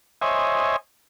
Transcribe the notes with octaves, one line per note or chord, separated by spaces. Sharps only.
C5 C#5 D#5 E5 G#5